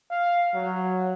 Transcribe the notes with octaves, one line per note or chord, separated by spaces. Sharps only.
F5
F#3